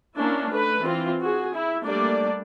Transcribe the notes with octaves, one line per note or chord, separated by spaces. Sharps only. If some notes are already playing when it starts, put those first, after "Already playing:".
A#3 C#4 D4 E4
A3 B4
E3 C4 F4
F#4 G#4
E4
G3 A3 A#3 D4 D5